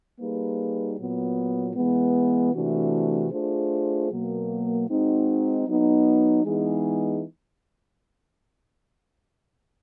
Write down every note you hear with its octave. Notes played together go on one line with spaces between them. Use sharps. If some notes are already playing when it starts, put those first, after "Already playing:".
G3 A#3 D#4 G#4 B4
A#2 F#3 B3
E3 G#3 B3
C3 E3 A3 D4 F#4
A3 D4 F4 G#4 C5
B2 F#3 A#3
G#3 C4 D#4 F#4
F#3 B3 D#4
E3 G#3 B3 D#4 G#4